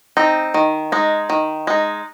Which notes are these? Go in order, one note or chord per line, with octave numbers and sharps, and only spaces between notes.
C4 D#4
D#3
G#3 D#4
D#3
G#3 D#4